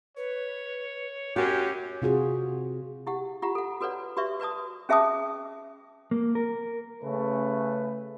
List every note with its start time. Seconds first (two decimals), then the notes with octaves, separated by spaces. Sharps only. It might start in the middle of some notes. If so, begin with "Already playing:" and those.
0.17 B4 C#5
1.36 F#2 C#4 F#4 G4 C#5
2.02 C3 F4 F#4 G#4
3.07 E4 G4 F#5
3.42 F4 G4 F#5 A#5
3.55 A4 F#5
3.81 F#4 A4 B4 C#5 D5 F#5
4.17 F#4 G4 B4 D5 E5 C#6
4.40 F#4 B4 D5 A5 D#6
4.89 C#4 G#4 E5 A5 D6 D#6
6.11 A#3
6.35 A#4
7.02 C#3 A3 C#4 B4